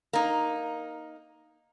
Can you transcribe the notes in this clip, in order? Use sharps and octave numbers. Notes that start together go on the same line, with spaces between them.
A#3 D#4